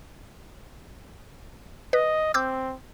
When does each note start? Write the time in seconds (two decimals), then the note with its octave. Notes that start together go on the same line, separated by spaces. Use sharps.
1.93 B4 D#5
2.34 C4 D6 E6 G6